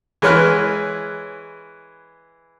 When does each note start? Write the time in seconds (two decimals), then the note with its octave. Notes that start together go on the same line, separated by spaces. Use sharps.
0.22 E3 G#3 B4 C#5 F6 F#6